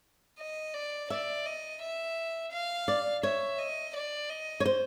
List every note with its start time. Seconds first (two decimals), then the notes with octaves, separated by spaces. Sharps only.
0.38 D#5
0.74 D5
1.10 D5 E5
1.45 D#5
1.81 E5
2.52 F5
2.88 D5
3.23 C#5 E5
3.59 D#5
3.95 D5
4.30 D#5
4.60 C#5
4.66 C5